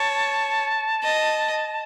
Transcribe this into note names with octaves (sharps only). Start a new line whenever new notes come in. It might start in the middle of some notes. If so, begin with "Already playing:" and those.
Already playing: C#5 A5
D#5